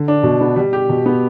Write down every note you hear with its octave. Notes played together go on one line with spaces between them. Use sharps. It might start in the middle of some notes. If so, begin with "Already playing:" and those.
Already playing: D3
D4
B2
B3
G3
G4
B2
B3